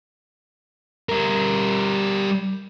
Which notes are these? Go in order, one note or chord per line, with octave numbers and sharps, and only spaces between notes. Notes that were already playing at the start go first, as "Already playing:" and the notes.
G3 A#4